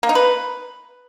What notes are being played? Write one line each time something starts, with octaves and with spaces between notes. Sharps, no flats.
A#3
D#4
B4